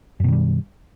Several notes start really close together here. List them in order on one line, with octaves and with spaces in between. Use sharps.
F#2 B2 D#3 G3